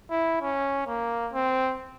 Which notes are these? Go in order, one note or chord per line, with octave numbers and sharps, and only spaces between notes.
E4
C#4
A#3
C4